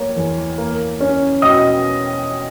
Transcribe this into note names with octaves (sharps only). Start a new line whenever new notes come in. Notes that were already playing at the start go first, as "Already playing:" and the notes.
Already playing: A#3 C#5
E2
A#3
C#4
B2 D#5 D#6